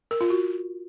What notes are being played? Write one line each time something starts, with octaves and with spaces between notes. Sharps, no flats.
A#4
F4
F#4